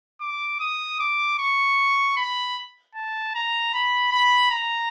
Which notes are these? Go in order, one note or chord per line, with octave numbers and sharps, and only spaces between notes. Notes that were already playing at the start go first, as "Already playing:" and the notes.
D6
D#6
D6
C#6
B5
A5
A#5
B5
B5
A#5